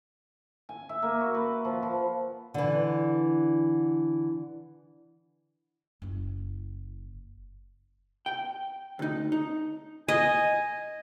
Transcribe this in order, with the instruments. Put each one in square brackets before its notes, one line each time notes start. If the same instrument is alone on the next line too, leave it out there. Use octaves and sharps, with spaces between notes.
[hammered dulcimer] G#5
E5
A#3
F#4
B4
F3
F3
[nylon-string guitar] D3 E3
[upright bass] F#1 E4
[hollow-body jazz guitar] G5
D2 D#4
D#4
[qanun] D#5 [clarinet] G#5